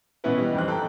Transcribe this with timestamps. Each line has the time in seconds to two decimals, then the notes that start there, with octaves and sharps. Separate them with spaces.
0.24 B2 E3 B3 C#4 E4 B4
0.38 E3 G3 D#5
0.54 F2 G#2 C4 F#6
0.68 A4 G5 A#5